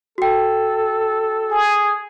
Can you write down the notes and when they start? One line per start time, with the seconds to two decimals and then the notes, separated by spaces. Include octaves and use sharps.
0.18 F#4 A4 G5
1.51 G#4